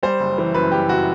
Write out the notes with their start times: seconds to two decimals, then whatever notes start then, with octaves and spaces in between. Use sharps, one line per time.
0.03 G3 C5
0.20 F#1
0.38 E3
0.54 F#2 B4
0.72 G3 G4
0.89 F#1 F#4